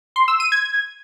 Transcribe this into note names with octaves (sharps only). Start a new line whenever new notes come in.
C6
E6
D#7
G#6